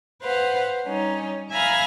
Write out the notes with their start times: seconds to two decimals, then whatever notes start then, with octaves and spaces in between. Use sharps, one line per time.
0.21 B4 C5 F5 F#5
0.84 G3 C#4 D#4
1.51 E5 F5 G#5 A#5 B5 F6